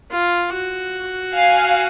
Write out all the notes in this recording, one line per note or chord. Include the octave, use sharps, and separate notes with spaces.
F4
F#4
F5 G#5